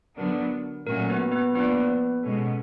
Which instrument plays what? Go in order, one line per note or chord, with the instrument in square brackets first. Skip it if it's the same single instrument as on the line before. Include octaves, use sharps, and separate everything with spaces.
[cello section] D3 F#3 B3 D4 [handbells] A#4
[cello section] A#2 F#3 A3 C#4 F#4 [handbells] A#4
[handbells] B3 B4
B3 B4
[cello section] F3 A#3 D4 [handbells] B3 B4
[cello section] B2 G#3 C#4 [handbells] A4